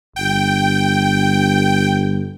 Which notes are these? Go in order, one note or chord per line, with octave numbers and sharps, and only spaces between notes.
G1 G5